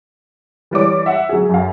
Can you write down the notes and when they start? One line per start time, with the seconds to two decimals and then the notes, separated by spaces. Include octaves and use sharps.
0.71 E3 G3 C#5 D6
1.06 E5 F#5
1.29 F#3 G#4
1.49 F#2 F5